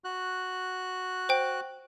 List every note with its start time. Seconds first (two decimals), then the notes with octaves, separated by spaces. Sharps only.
0.04 F#4 F#6
1.29 C5 G5